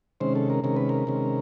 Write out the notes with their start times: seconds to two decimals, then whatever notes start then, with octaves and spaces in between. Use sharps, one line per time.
0.20 C3 D#3 G#3 C#4 C5
0.36 A4
0.50 A#4
0.64 C3 D#3 G#3 C#4 A#4
0.77 B4
0.89 A#4
1.07 C3 D#3 G#3 C#4